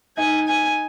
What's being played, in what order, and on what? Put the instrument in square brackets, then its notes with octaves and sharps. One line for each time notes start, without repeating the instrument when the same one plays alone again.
[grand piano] D#4 [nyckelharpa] G#5
[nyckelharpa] G#5